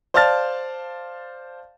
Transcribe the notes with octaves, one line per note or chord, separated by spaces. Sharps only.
C5 D5 F5 A5 F6 A6